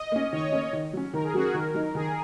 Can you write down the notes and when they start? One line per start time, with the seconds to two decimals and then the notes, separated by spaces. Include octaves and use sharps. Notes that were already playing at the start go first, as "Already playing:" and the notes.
Already playing: D#5
0.12 A#3 C#4
0.32 D#3 C#5
0.52 A#3 C#4
0.73 D#3
0.93 F#3 C#4
1.13 D#3 A#4
1.24 G#4
1.34 F#3 F#4
1.37 C#4
1.44 G#4
1.54 D#3 A#4
1.74 F#3 D#4
1.95 D#3 G#4